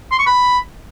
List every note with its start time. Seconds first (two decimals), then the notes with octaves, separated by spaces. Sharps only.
0.11 C6
0.19 C#6
0.26 B5